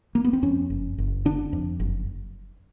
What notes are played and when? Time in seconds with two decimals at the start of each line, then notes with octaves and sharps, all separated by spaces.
0.15 A#3
0.25 B3
0.33 C4
0.42 F2 C#4
0.70 F#1
0.98 F#1
1.25 D3 D4
1.53 F2
1.80 F#1